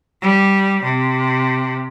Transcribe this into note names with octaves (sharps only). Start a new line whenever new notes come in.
G3
C3